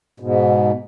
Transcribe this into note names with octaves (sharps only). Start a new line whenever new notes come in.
G#2 B2